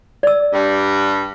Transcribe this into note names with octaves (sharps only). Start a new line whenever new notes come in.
D5 E6
G2 G3